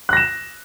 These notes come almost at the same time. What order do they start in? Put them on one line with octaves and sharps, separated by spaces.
F#6 A#6 E7